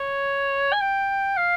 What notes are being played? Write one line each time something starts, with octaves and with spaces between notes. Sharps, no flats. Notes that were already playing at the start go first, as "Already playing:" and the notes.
Already playing: C#5
G#5
G5
F5